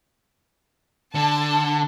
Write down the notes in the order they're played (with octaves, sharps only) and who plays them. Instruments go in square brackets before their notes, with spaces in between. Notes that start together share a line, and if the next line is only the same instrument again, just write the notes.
[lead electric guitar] D3 [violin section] A5